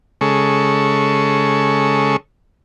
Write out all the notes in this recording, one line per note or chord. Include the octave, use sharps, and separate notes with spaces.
C#3 G#3 A4 C#6